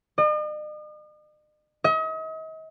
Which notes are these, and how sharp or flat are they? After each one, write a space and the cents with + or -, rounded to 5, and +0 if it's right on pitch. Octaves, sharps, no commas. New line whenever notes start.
D#5 -45
D#5 +40